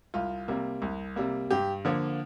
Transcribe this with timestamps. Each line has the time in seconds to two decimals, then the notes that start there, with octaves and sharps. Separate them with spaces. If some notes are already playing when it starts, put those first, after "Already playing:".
0.14 C2 F4
0.48 C3 G3 A#3
0.82 C2
1.16 C3 G3 A#3
1.51 G2 G4
1.85 D3 F3 A#3